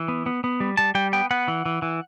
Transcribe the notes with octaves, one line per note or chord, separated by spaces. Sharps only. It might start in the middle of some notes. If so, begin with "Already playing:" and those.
Already playing: E3
B3
B3
B3
G3
G3 A5
G3 G5
B3 G5
B3 F#5
E3
E3
E3